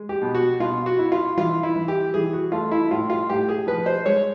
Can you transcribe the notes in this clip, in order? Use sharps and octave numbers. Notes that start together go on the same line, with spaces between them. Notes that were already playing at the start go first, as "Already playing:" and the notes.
Already playing: G#3
G4
B2
F#4
B2 F4
F#4
E4
F4
E3 F4
E4
E3
G4
E3 G#4
F#4
A3 F4
E4
A2 F4
F4
A2 G4
G#4
F3 B4
C5
G#3 C#5